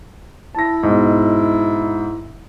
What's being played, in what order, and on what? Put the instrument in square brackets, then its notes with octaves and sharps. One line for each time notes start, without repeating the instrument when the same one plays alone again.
[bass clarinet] E4 [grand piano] A5 A#6
[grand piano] G#2 B2